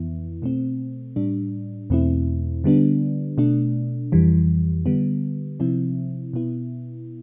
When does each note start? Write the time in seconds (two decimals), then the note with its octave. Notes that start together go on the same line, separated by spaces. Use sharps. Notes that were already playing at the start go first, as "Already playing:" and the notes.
Already playing: F2 E3 B3 E4
0.42 B2 A3 C4
1.16 A2 G3 D4
1.90 E2 B2 A3 C4 E4
2.64 D3 G3 B3 D4
3.38 B2 A3 D4
4.12 F2 E3 G3
4.86 D3 G3 B3
5.60 C3 F3 C4 E4
6.33 B2 B3 E4